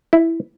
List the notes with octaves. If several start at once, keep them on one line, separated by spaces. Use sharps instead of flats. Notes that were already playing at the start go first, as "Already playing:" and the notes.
E4